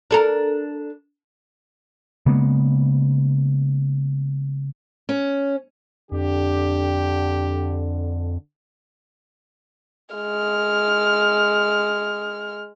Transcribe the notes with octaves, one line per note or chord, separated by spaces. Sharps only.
D4 A4 A#4
C#3 G#3 A#3 B3
C#4
F2 D3 D4 G4
G#3 F6